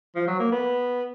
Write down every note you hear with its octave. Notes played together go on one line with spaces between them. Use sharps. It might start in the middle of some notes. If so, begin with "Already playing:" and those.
F3
F#3
A#3
B3